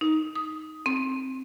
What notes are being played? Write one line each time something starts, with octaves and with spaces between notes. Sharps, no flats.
D#4
D#6
C4